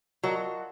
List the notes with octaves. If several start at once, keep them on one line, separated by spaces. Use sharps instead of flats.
F#3 F4 A#4 D#5 F#5 A5